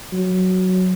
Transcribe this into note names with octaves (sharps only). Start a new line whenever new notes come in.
F#3